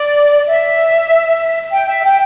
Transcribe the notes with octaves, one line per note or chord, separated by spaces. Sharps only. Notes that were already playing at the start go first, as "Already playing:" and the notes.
Already playing: D5
E5
G5
E5
G5